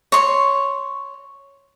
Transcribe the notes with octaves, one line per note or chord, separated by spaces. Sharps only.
C#5 C6